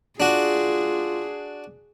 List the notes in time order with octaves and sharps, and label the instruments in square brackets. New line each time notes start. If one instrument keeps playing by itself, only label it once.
[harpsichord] D4 F#4 [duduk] F4 [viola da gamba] G#4